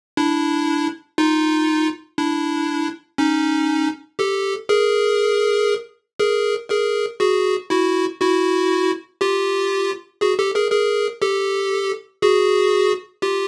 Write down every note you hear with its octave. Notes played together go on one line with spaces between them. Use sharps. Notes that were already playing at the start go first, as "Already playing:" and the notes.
D4 E4
D#4 F4
D4 E4
C#4 D#4
G4 A4
G#4 A#4
G#4 A#4
G#4 A#4
F#4 G#4
E4 F#4
E4 F#4
F4 G4
F#4 G#4
G4 A4
G#4 A#4
G#4 A#4
G4 A4
F#4 G#4
F4 G4